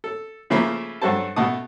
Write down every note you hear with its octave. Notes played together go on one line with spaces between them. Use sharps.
A4
C#3 F3 A3 A#3 E4
G2 F#3 F#4 A4 C5 A5
B2 A3 F#5 A5 D#6